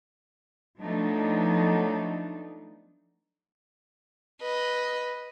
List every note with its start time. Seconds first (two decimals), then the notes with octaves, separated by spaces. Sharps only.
0.81 F3 F#3 A3 B3 D4 D#4
4.41 B4 D#5